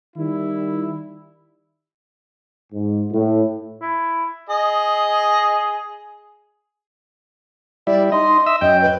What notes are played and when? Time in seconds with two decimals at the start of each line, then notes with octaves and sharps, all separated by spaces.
0.17 D#3 G3 E4
2.73 G#2
3.12 A2
3.82 E4
4.49 G#4 D#5
7.87 G3 E4 D5
8.12 D#4 D#5 C6
8.46 D#5 E5 E6
8.61 F#2 D#5 G5
8.81 B4